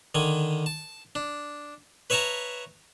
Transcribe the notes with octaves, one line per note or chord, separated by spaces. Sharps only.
D3 D#3 G#5
A5
D4
B4 C#5 E5 A5 A#5